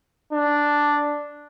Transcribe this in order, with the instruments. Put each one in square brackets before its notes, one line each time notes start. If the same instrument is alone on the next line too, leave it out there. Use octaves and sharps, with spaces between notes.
[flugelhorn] D4